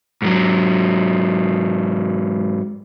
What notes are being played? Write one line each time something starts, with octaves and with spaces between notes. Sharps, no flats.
G#2 F#3